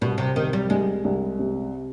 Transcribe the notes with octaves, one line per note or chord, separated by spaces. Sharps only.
C2 B2
C3
C3 D#3
G3
C2 G#3
C2
C3